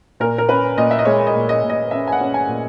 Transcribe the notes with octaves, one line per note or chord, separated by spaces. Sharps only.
A#2 A#4
A#4
C#4 B4
A#2 D#5
E5
D#5
G#3 C#5
D#5
A#2
D#5
A#2
D#5
C#4 E5
G#5
F#5
C#4
G#5
A#2